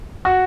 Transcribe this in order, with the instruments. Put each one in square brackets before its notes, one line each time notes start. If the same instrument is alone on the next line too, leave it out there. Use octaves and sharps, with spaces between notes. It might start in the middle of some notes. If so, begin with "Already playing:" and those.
[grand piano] F#4